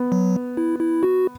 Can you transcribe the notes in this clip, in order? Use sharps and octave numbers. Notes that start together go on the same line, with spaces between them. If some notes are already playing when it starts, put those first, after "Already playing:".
Already playing: B3
F#3
E4
E4
F#4